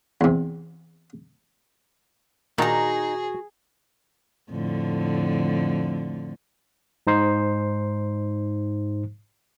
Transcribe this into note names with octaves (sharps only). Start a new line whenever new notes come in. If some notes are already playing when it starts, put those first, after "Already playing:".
E2 C3
A#2 D#3 D4 D#4 F#4 G#4 A#5
F2 A2 D3
G#2 D#4 C5 C7